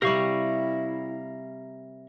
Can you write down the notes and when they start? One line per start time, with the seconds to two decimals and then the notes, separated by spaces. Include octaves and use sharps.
0.02 C3 G3 E4 G4 A#4 F5 C#6